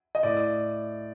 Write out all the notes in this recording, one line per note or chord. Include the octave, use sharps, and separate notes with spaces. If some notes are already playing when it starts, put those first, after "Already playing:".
D#5
A2 D5